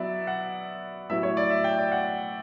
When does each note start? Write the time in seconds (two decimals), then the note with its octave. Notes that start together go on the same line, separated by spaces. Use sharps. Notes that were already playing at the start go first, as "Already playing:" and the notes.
Already playing: F#3 B3 E4 D5 E5
0.27 F#5
1.09 A2 F#3 B3 E4 E5
1.23 C#5
1.37 D5
1.50 E5
1.64 G5
1.78 D5
1.92 F#5